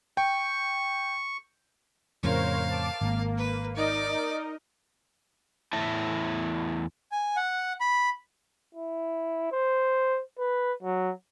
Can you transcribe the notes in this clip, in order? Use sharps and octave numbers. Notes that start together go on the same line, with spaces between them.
G5 C#6
F2 A2 C#3 A#4 C5 C#5 F5
A5 D6
G#1 A#3
B4
D#4 A#4 D5 D#5
E2 A3 E4 E5 A5
G#5
F#5
B5
E4
C5
B4
F#3